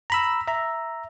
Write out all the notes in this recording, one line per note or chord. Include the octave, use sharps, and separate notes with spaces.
A#5 B5 E6
E5 A#5